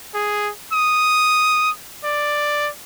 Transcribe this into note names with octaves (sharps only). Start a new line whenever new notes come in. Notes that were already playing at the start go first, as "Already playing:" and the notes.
G#4
D#6
D5